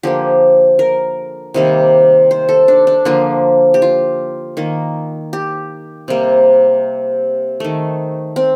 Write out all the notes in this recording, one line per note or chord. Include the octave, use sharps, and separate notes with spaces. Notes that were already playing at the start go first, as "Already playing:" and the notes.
D3 F3 A#3 G4
A#4
C3 D#3 G3 A#3
C5
A4
D4
D4
D3 F3 A#3 F4
G4
F4
D#3 A#3
G4
C3 G3 A#3
D#3 A3
C4